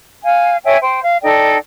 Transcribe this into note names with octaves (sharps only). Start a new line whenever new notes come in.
F5 G#5
C#5 E5 G5 G#5
C5 G5
F5
D#4 A4 D5 G5